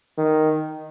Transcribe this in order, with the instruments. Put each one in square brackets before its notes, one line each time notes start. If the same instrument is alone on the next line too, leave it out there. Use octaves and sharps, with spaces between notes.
[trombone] D#3